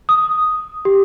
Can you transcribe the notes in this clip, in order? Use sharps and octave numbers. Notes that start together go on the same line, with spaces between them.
D#6
G4